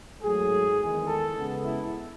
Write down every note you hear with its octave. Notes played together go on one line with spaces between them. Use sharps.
G#2 F#3 A3 G#4
E2 D#3 G#3
A4
C#3 G#3 B3
E4